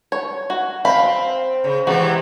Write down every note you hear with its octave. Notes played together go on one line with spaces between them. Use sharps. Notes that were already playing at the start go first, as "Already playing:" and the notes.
C#5
F#4
C4 F5 B5
C#3
C3 E3 G#3 F#4